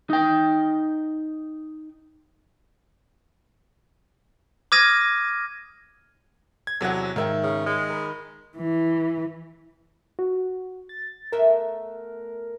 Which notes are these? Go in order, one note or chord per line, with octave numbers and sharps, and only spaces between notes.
D#4 G5
D6 D#6 F6 G#6 A#6 D#7
G#6
E2 C3 F#3 A4 F#5
G#2 D#3 A#3 A#4 E5 G5
C#3
G#3
A#4 B5
E3
F#4
A6
A3 B3 A#4 E5